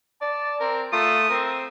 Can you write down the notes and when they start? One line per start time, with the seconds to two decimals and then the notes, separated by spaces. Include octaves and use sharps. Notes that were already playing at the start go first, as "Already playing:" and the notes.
0.21 D5 A5
0.60 C4 A#4
0.92 A3 F4 D#6
1.30 C4 A#4